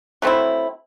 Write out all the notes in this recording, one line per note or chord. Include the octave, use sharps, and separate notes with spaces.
F#3 A3 C4 E4